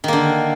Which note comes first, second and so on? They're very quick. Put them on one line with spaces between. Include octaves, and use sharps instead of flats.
D#3 A#3 D3